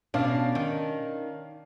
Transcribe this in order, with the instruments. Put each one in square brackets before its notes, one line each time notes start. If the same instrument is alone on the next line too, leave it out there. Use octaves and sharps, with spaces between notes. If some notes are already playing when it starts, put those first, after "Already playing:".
[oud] B2 [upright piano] C#4 F5 [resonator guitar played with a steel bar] D4
[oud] D#3